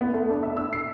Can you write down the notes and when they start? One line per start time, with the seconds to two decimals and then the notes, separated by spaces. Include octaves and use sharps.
0.01 B3
0.14 A3
0.29 D4
0.43 E5
0.57 E6
0.73 C7